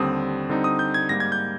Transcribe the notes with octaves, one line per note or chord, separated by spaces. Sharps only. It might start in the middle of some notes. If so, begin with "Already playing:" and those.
Already playing: D#2 D3 G3 C4 D#6
D3 G3 C4 D#4
D#6
G6
G#6
G#2 G3 A#3 A#6
G#6
G6